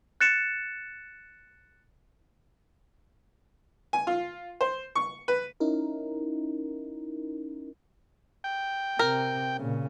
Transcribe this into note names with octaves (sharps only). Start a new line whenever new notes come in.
F#6 A6 C#7 E7
G#5
F4
C5
C#6
B4
C#4 D#4 E4 A#4
G5
C3 A#4
A#2 C#3